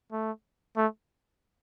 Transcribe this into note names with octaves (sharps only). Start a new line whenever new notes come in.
A3
A3